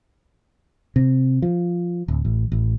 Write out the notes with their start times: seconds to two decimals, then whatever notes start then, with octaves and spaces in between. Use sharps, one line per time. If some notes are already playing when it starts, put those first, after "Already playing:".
0.96 C3
1.42 F3
2.08 D1
2.25 A1
2.52 A1